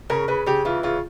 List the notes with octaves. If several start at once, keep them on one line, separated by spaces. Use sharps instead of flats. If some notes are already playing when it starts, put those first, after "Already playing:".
C#3 A#4
C#3 B4
C#3 G4
E3 F4
C#3 F4